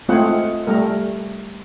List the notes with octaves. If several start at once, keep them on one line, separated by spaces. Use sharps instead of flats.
G#3 A3 C4 F4 G#4 F#5
G3 A3 A#4